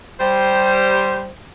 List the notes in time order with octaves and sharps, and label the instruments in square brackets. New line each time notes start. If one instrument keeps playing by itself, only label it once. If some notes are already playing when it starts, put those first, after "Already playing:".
[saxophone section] G3 C5